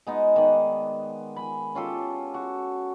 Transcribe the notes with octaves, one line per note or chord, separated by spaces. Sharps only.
G#3 B3 D#4
D#3 B3 D5
G#5 B5
C#4 F4 G4 A4
F#4